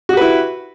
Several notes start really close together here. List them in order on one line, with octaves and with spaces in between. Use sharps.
F#4 G4 B4 E4